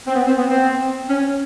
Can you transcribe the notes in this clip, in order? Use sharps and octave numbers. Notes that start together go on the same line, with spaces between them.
C4
B3
C4
B3
C4
C#4